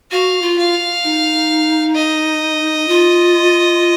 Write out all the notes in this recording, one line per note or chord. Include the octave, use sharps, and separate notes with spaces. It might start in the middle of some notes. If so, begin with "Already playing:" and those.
F#4 F5
F4
F5
D#4
D#5
F4